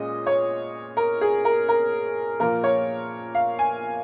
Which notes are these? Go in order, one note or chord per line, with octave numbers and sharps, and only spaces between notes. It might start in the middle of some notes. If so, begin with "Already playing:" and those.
Already playing: A#2 G#3 C#4 D#5
C#5
A#4
G#4
A#4
A#4
A#2 F3 A#3 A#4
C#5
F5
G#5